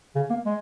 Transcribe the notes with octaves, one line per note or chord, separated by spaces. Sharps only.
C#3
A#3
G#3